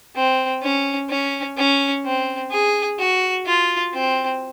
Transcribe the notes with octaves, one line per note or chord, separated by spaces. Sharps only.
C4
C#4
C#4
C#4
C4
G#4
F#4
F4
C4